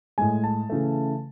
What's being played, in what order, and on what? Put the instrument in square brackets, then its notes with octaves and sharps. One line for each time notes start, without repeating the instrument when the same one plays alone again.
[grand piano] A2 G#3 G#5
A5
C#3 E3 A3